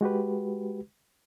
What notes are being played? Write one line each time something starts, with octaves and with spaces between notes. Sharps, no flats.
G#3 F#4 G4 B4